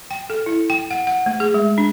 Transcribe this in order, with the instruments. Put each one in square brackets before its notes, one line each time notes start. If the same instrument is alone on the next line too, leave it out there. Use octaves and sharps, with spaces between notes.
[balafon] G5
A4
E4
G5
F#5
F#5
A3
G#4
G#3
D4